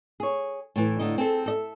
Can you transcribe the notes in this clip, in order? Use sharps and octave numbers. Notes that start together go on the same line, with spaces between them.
G#4 C#5
A2 E3
A2 D3 D#4 D#5
C4 G#4 A4
A4 D#5 E5